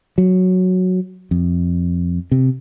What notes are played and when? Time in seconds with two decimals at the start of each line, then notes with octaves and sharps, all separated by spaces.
0.18 F#3
1.31 F2
2.32 C3